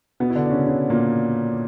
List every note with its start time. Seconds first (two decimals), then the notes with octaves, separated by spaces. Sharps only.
0.20 B2 B3
0.30 E4
0.35 D3 D4
0.46 D4
0.50 C#3 C#4
0.66 C#3 C#4
0.90 A#2 A#3